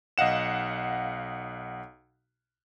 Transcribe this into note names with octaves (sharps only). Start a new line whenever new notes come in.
B1 D#5 F5 F#5 E7